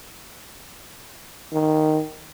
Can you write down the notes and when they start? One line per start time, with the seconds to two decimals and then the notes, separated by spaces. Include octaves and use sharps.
1.53 D#3